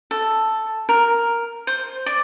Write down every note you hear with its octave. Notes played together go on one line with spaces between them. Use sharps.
A4
A#4
C5
D5